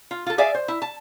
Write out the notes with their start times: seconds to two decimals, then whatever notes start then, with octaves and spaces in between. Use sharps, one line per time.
0.11 F4
0.26 F4 A4
0.38 G#4 D5 E5 F5 G#5
0.55 C5
0.68 E4
0.82 A5